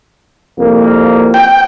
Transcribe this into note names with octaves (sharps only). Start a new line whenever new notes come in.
C2 F2 A#3
G5